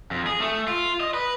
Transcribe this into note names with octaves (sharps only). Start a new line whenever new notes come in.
F2
G#4
A3
F4
D#5
B4